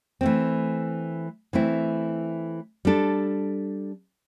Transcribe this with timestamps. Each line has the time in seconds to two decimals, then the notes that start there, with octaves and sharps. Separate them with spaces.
0.21 E3 A3 C4
1.53 E3 A3 C4 E4
2.85 G3 D4 A4